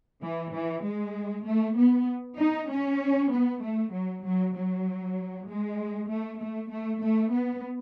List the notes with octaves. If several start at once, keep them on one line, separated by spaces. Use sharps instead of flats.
E3
E3
G#3
A3
B3
D#4
C#4
B3
A3
F#3
F#3
F#3
G#3
A3
A3
A3
A3
B3